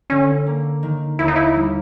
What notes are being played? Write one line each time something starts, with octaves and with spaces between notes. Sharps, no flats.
D3 C#4
A#3
D#3
D#2 E4
D#4
E4
G3